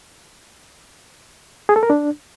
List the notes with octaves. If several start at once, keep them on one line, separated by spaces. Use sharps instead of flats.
G#4
A4
A#4
D4